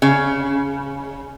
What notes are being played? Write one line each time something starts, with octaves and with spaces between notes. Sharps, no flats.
C#3